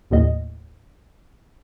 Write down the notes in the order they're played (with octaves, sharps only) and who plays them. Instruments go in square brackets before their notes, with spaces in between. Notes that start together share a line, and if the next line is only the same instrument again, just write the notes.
[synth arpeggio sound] A#1 D#2 A2 D#5